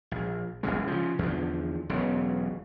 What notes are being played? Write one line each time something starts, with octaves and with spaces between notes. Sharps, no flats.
A#1
F#1 C#2 C#3 G#3
C#3 F3
E2 D3 F3
E1 B1 C#3